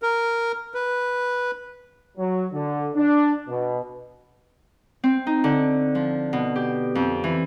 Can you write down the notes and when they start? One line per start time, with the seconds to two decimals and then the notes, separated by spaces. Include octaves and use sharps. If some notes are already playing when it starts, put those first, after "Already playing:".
0.02 A#4
0.74 B4
2.17 F#3
2.53 D3
2.96 D4
3.48 B2
5.04 C4
5.27 D#4
5.44 D3
5.95 F3
6.33 B2
6.56 G4
6.95 F2
7.24 E3